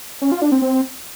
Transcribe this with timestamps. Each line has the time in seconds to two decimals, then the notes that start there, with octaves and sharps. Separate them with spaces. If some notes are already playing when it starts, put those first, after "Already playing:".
0.22 C#4
0.32 F4
0.42 D4
0.52 C4
0.62 C4